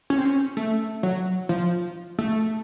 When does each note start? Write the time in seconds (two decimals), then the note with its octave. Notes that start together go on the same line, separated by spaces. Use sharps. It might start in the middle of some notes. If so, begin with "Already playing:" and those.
0.10 C#4
0.18 C4
0.25 C#4
0.57 A3
1.03 F#3
1.49 F3
2.19 A3